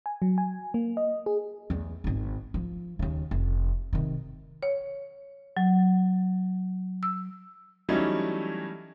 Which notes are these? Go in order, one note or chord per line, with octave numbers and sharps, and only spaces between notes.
G#5
F#3
G#5
A#3
D#5
G#4
E2 A3
G#1 D#4
F3
D#2 C#3
F1
C3 D#3
C#5
F#3
E6
E3 F#3 G3 A3 C#4 D#4